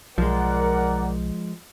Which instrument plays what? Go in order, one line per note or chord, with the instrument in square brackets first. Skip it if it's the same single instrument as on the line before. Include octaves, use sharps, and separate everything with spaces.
[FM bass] B1 [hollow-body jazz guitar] F3 G#3 [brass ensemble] A#4 D5 F#5